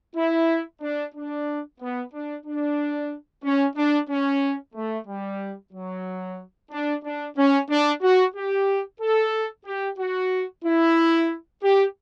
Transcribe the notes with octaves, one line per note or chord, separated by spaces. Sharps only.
E4
D4
D4
B3
D4
D4
C#4
D4
C#4
A3
G3
F#3
D4
D4
C#4
D4
F#4
G4
A4
G4
F#4
E4
G4